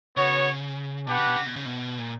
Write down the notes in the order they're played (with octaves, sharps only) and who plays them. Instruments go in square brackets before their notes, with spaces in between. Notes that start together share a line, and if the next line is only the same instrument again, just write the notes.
[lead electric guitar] C#3 [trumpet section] B3 F#4 C#5
[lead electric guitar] B2 [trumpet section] D4 G4 B4 F#5
[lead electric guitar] C#3
B2
C#3
B2
C#3
B2
A#2